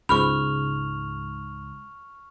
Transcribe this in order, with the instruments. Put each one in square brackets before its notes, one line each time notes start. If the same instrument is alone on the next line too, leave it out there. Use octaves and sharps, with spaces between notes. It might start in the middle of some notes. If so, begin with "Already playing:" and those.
[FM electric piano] C#2 G#2 [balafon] B5 [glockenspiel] C#6 F6 F7